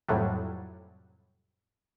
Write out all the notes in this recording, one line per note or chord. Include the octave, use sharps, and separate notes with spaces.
F2 A2 C3 F#3 G3